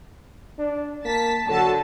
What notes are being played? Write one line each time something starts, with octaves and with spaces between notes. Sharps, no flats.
D4
A#3 A5 B6
D3 F#3 F#4 A4 A5